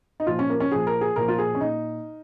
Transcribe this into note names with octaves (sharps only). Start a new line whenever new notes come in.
D#4
A#2 F3 F4
C#4
A#3
C#4
A#2 F3 G#4
A#4
G#4
A#2 F3 A#4
F4
G#4
C#4
A#2 D#4